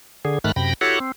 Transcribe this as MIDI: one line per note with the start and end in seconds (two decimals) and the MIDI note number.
0.25 0.39 50
0.25 0.39 68
0.44 0.52 44
0.44 0.52 51
0.44 0.52 57
0.44 0.52 83
0.44 0.52 89
0.44 0.52 90
0.56 0.73 42
0.56 0.73 48
0.56 0.73 79
0.56 0.73 83
0.56 0.73 94
0.81 0.99 64
0.81 0.99 66
0.81 0.99 67
0.81 0.99 69
0.81 0.99 73
0.81 0.99 78
1.00 1.12 60